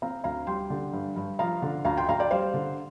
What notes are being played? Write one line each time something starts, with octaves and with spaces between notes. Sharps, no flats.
C4 F5 A#5
D2 F5 A#5
G3 G5 C6
D3
G2
G2
F3 F5 A#5
D3
D2 F5 A#5
G5 C6
D2 F5 A#5
D5 G5
G3 C5 F5
D3